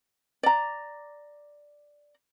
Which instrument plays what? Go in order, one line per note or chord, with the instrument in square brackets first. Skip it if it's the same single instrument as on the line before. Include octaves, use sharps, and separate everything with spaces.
[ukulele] D5 A#5